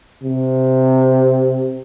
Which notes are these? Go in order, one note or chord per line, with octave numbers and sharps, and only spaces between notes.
C3